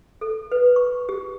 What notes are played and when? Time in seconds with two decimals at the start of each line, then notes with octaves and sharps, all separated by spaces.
0.21 A4
0.52 B4
0.76 C#6
1.09 G4